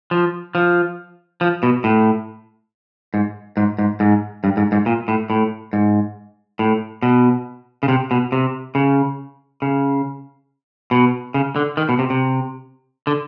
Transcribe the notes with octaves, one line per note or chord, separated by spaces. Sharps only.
F3
F3
F3
B2
A2
G#2
G#2
G#2
G#2
G2
G#2
G#2
A#2
A2
A2
G#2
A2
B2
C#3
C3
B2
C3
C#3
C#3
B2
C#3
D3
D#3
B2
C3
C3
D3